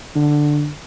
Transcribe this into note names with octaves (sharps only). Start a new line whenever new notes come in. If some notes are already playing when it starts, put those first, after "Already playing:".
D3